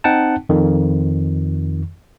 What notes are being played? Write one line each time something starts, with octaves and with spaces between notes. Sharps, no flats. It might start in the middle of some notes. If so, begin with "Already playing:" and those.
C4 D#4 F#5 G5 A5
F2 D#3